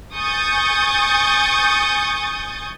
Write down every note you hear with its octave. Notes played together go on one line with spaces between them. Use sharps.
G#5 C#6 D#6 G6 A6